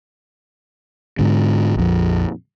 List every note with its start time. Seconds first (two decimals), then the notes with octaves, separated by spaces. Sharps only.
1.19 G#2 D3
1.75 A#1 F2